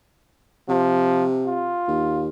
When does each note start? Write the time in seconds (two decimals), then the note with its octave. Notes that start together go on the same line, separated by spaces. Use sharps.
0.69 C3 F3
1.46 F4
1.88 D#2